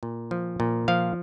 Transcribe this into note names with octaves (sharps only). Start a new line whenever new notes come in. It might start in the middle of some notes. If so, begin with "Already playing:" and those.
A#2
F3
A#2
F3 F5